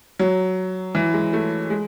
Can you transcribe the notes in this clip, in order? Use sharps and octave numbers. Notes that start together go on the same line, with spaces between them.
F#3
E3
G#3
A3
G#3